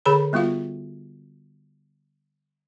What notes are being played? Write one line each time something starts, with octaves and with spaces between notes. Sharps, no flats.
D3 G#4 A4 C#5 A#5 B5
G3 B3 F4 F#4 F5